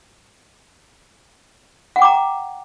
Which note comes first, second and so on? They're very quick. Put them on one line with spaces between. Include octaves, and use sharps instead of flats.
F#5 G5 D6 A#5